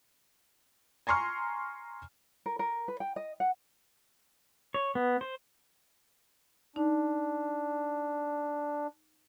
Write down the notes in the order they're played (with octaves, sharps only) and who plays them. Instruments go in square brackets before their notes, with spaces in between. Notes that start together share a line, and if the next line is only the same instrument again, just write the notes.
[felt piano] G#5 A#5 C6 C#6 F6
[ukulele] A#4
A#4
B4
G5
D#5
F#5
[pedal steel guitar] C#5
B3
C5
[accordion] D4 [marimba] D#4